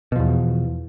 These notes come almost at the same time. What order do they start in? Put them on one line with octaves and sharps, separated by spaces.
B2 F3 E2